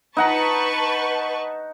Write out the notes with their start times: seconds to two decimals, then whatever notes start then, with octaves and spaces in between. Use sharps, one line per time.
0.17 D#4 B4 F#5 A5 A#5 C#6